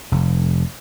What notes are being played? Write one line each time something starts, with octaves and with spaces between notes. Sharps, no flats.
F1